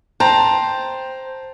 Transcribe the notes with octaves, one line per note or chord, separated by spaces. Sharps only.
C5 G5 A5 A#5